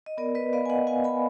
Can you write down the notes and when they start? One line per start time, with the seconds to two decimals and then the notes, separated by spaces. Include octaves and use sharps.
0.06 D#5
0.17 B3 A#4 D5
0.35 B4 D#5
0.53 B3 D5 F5
0.66 G#5
0.70 D#5 F#5
0.87 B3 F5 G#5
1.04 G#5 B5